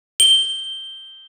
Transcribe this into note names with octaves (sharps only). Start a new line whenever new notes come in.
G7